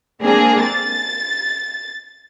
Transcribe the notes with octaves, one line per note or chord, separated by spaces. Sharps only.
A#3 C4 D4 G#4
A6